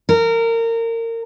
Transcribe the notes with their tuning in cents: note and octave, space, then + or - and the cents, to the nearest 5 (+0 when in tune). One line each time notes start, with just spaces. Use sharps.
A#4 -25